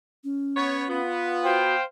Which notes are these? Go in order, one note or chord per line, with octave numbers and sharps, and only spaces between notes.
C#4
B3 C#5
B3 F4
F#4 C5 F5 G5